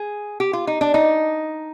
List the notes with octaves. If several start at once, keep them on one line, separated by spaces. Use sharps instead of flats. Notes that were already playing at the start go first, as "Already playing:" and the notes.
Already playing: G#4
G4
F4
D#4
D4
D#4